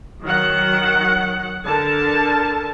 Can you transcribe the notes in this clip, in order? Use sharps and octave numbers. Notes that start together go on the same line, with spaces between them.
D#3 F#3 F#5
D3 A#4 A5